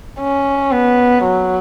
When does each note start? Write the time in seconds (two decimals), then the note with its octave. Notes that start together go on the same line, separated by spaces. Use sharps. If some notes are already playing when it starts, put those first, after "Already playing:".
0.20 C#4
0.71 B3
1.24 F#3